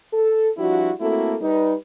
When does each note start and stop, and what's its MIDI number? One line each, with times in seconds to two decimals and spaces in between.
0.13 0.49 69
0.58 0.91 53
0.58 0.91 55
0.58 0.91 62
0.58 0.91 64
0.58 0.91 66
1.00 1.36 57
1.00 1.36 58
1.00 1.36 60
1.00 1.36 64
1.00 1.36 66
1.00 1.36 69
1.42 1.74 55
1.42 1.74 63
1.42 1.74 71